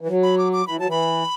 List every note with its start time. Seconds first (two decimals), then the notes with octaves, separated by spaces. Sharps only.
0.01 E3
0.08 F#3
0.23 B5
0.38 D6
0.53 D6
0.67 E3 B5
0.77 F#3 A5
0.87 E3 B5